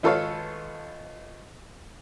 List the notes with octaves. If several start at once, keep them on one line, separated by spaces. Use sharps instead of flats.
G#1 F4 A4 B4 C#5 F5